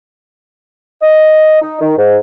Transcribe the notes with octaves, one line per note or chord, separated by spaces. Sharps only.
D#5
D#4
D#3
G#2